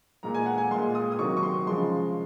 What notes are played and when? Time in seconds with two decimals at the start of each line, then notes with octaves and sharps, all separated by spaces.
0.23 A#2 G#3 A#5
0.34 G#5
0.46 F#5
0.58 G#5
0.71 A#2 G#3 C6
0.95 D#6
1.12 D#6
1.19 C3 D#3 F#3 C#6
1.37 C#6
1.43 C6
1.67 C#3 F3 G#3 C6